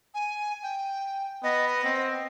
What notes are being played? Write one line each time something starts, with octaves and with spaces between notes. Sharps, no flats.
G#5
G5
B3 D#5
C4